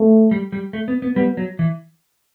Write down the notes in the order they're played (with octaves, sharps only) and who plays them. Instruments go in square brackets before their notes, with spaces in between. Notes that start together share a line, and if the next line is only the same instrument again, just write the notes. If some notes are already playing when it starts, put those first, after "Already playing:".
Already playing: [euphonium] A3
[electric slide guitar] G3
G3
A3
B3
B3
[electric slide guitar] G3 [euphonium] B3
[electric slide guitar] F#3
E3